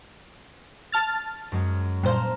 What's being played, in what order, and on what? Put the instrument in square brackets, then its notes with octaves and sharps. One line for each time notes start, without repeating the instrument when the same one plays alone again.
[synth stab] A5 F6 A6
[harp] F#2 G#3 C#4
[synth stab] G2 A#2 C5 [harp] A5 A#5 F6